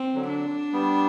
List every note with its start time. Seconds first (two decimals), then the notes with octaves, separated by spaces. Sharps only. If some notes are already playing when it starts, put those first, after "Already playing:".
Already playing: C4
0.15 D3 F#3
0.29 D4
0.73 G3 B3